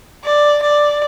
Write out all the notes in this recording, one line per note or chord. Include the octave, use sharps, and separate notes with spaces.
D5
D5